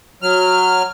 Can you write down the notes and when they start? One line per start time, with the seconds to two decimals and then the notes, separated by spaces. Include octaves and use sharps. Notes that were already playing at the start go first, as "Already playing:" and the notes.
0.22 F#3 F6